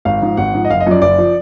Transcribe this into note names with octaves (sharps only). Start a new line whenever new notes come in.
G#1 F5
G#2 F3
G#1 F#5
G#2 F3
D#5
F#1 F5
D#5
F#2 F3 D5
F#1 D5
F3